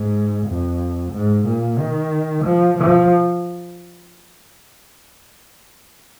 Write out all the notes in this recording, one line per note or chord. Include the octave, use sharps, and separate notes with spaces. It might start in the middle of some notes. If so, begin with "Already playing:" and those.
Already playing: G#2
F2
G#2
A#2
D#3
F3
F3